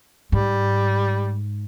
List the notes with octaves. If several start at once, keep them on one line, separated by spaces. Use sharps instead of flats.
G#2 G3